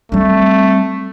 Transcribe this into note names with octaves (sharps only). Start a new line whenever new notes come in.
G3 A3 C4